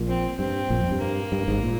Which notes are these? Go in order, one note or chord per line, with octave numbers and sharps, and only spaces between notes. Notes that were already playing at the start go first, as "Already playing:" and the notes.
Already playing: A#1 A#2
C4
G2 C4
A#1 A#2
F2
G2
A#3
G2
G#1 G#2
A#2